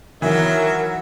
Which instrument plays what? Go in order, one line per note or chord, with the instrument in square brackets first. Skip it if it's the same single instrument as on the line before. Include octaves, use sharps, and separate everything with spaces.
[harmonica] D#3 E5 [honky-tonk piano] E3 [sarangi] F#3 [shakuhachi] A#4